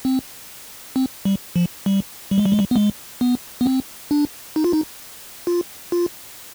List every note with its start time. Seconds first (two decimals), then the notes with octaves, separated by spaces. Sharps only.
0.05 C4
0.96 C4
1.25 G3
1.56 F3
1.86 G3
2.31 G3
2.38 G#3
2.45 G3
2.52 G#3
2.59 G3
2.71 B3
2.76 G#3
3.21 B3
3.61 B3
3.66 C4
4.11 D4
4.56 D#4
4.64 F4
4.73 D#4
5.47 F4
5.92 F4